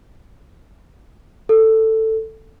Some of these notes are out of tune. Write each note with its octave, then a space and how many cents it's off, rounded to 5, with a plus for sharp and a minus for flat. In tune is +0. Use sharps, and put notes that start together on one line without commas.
A4 +10